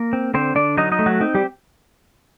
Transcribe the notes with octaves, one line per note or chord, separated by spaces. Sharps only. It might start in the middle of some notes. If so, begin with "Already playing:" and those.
Already playing: A#3 A#4
C4
D3 C4 C5
D3 D4 D5
F#3 D#4 D#5
D#4 D#5
A3
F#3 F#4
C4 D#4
G3 G4